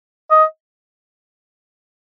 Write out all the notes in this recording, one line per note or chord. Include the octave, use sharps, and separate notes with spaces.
D#5